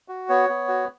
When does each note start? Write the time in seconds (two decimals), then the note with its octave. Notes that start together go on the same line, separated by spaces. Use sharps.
0.08 F#4
0.29 B3 C#5
0.49 B3
0.68 F#4